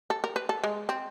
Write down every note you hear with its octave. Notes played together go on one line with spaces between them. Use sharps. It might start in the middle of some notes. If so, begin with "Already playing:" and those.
A4
A#4
B4
A4
G#3
C4